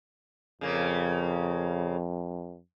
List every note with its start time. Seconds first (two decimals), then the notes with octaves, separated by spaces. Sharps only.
0.61 F2 C#3 A#3